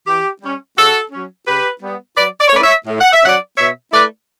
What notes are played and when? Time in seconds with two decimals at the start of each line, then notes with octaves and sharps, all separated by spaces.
0.07 E3 G4
0.42 G3 C#4
0.77 C#3 F#4 A4
1.12 F#3 C#4
1.47 C#3 G4 B4
1.82 G3 B3
2.17 F#3 B4 D5
2.40 D5
2.48 C#5
2.52 A3 C#4 E4 B4 D5
2.63 C#5 E5
2.87 A2
3.01 F#5
3.13 E5
3.22 F#3 C#4 D5 F#5
3.57 B2 C#5 E5
3.92 A3 E4 B4 D5